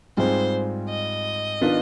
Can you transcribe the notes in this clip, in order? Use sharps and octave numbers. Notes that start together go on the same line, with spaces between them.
G#2 G3 C4 F4 G#4 C5
D#5
D#3 B3 D4 F4 B4